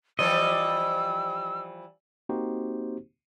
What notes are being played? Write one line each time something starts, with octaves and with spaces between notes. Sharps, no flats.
E3 F3 G3 D#5 E6
A#3 C4 D#4 F#4 G4 C5